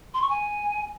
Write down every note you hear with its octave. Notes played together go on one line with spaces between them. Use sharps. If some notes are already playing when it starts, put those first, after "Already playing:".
C6
C#6
G#5